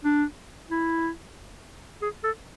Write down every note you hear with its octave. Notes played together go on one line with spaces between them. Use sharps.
D4
E4
G#4
A4